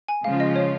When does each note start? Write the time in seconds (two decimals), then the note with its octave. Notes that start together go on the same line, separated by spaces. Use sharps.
0.08 G#5
0.24 C#3 F3 G#3 C#4 F4 F5
0.40 D#5
0.56 C#5